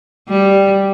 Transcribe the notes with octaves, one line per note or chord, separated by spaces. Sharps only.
G3